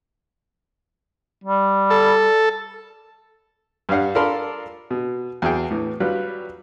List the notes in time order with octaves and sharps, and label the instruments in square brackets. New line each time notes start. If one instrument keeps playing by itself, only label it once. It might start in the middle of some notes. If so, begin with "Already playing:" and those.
[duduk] G3
[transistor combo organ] A4
[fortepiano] G2 G3 D4 F5 F#5
D4 F4 A4 A#4 B5 C6
B2
E2 F#3 G#4 G5
A2 E3
F#3 G3 F4 B4